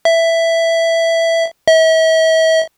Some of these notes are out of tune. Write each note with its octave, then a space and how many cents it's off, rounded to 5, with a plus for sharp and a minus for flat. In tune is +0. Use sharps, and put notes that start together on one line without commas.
E5 +5
E5 -40